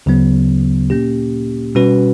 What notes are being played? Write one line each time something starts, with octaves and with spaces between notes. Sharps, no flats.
D2 C#3 F#3 B3
A#2 A#3 C#4 G4
B2 G3 C#4 F#4 B4